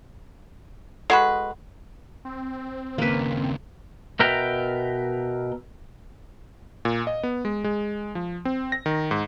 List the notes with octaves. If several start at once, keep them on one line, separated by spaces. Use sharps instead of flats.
G#3 F#4 A4 B4 F#5
C4
D#2 C#3 A#3 B4
B2 A#4 B4 E5 G5 A#5
A#2
D#5
B3
G#3
G#3
F3
C4
A#6
D#3
G#2